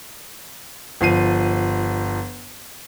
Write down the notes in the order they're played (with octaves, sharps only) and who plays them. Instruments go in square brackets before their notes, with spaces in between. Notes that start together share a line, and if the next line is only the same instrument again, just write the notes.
[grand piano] G1 F3 C7 D#7